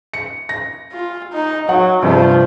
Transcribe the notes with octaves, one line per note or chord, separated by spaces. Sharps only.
C#7
A#6
F4
D#4
F#3 F#5
G2 C3 F3